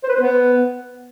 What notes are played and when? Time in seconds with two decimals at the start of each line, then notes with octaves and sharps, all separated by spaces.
0.03 C5
0.09 B4
0.15 C5
0.20 B3